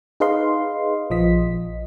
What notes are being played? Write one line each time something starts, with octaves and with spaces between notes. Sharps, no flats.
D#4 G#4 B4 D#5 F5 C6
A#1 F3 D#5 B6